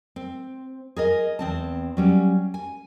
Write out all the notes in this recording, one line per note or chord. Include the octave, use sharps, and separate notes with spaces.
C4
G#4 A#4 D#5
E2 C4 A5
F#3 G3 C#4
G#5